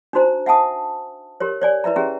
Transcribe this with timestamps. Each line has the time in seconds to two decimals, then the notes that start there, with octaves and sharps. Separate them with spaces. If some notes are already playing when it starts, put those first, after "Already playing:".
0.13 D4 D#4 F#4 C5 A#5
0.46 E5 F#5 G#5 A5 D#6
1.40 G4 A#4 C#5
1.62 C#5 D5 G#5
1.84 E4 B4 E5 A#5
1.96 C#4 G4 G#4 E5 A#5